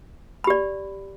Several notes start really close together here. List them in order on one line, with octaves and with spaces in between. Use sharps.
B5 G4 D5